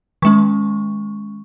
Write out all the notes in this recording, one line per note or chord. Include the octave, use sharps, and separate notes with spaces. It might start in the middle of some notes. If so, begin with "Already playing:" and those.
D#3 G#3 C#4 C#6